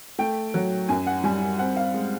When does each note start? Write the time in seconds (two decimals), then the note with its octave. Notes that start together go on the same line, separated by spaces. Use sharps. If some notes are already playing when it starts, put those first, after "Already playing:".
0.19 A3 G5
0.54 F#3
0.89 F#2 G#5
1.07 F#5
1.24 G3 G#5
1.59 C4 F#5
1.77 F5
1.94 G#3